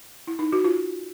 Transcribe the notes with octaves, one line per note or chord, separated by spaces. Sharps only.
E4
D#4
F#4
F4